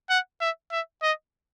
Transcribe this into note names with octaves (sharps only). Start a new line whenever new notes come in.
F#5
E5
E5
D#5